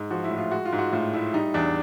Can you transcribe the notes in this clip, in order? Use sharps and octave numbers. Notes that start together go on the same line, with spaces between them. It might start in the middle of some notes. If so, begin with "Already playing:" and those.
Already playing: G#2
F3 F#4
E4
A2
F4
G#3 F#4
F4
G#2
F#4
A2 F4
A3 E4
G3 D#4
E2 D4